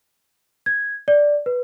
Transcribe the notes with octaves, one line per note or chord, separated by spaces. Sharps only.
G#6
D5
B4